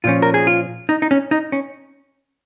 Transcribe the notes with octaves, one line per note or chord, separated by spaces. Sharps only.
A#2 F3 C#4 F4
A#4
G#4
F4
D#4
D#4
C#4
D#4
C#4